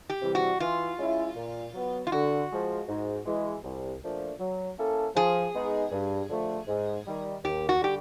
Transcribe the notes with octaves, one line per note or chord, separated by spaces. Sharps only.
G4
C3 E3 G3
F#4
E3 F4
G#3 C#4 E4
A#2
F#3 B3
F4
D3 F#4
F3 G#3
G#2
E3 G#3
C2
A#2 F3 A3 D4
F#3
A#3 C#4 E4 A4
F3 G#4
G#3 B3 D#4
G2
D3 F3 A3
G#2
D#3 G3
D#2 G4
F#4
D3 G3 G4